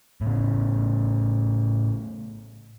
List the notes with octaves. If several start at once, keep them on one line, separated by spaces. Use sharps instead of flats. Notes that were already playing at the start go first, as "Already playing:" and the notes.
A2 C#3